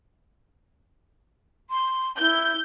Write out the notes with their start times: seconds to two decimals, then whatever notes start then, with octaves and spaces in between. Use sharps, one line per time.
1.70 C6
2.19 E4 G6